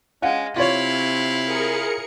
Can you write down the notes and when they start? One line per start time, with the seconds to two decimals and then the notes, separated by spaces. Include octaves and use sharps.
0.22 G#3 C#4 F5 F#5
0.56 C3 E4 F4 C#5 F5
1.46 G#4 A#4 C#7